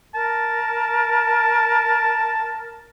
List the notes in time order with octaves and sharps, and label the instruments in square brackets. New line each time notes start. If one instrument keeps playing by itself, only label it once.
[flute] A#4 [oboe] A5